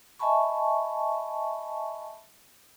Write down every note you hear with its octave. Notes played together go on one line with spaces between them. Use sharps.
D#5 E5 G#5 A5 B5 C#6